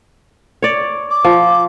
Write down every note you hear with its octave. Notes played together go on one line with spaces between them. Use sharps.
C#5 D5
D6
F3